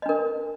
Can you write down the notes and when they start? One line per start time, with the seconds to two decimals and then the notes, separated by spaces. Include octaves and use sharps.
0.02 D#5
0.06 D4
0.09 A#4